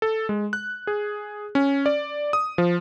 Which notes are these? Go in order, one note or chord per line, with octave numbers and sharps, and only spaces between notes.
A4
G#3
F#6
G#4
C#4
D5
D#6
F3